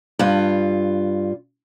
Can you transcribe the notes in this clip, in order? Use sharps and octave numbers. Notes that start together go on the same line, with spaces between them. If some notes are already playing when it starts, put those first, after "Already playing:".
G2 F4